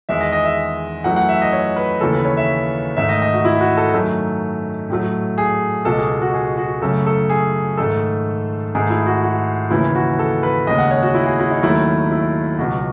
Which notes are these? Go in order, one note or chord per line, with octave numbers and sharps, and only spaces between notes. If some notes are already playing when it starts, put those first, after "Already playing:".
E2 D#3 G#3 E5
D#5
D#5
E5
F#2 E3 A3 F#5
F#5
E5
D#5
C#5
B4
D#2 C#3 E3 A4
B4
C#5
E5
G#2 D#3 A3 E5
D#5
D#5
F#4
E4
F#4
A4
F#2 D#3 F#3 A3
A2 F#3 A3
G#4
C#2 B2 G#3 A4
G#4
F#4
G#4
F#4
F#2 C#3 F#3 A3 A4
A4
G#4
G#2 D#3 A3 A4
G#2 D#3 A3 G#4
E4
F#4
F#4
D#2 C#3 E3 E4
F#4
A4
B4
D#2 C#3 G#3 D#5
F#5
C#5
F#4
E4
G#4
E4
D#4
D#2 D#3 F#3 A3 E4
E4
C#2 B2 F#3 F#4